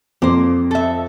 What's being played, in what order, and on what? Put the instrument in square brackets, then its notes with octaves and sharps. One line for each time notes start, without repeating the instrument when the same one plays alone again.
[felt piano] F2 [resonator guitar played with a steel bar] A#3 C5
[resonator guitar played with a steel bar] A4 E5